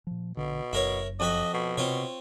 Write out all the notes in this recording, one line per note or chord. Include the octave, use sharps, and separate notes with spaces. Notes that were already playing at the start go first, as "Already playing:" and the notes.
A#2 F3
A#1 B2 D3
F#1 F#2 E4 A#4 C#5
F2 F#4 D#5 B5
B2
C3 C4 F4 C#5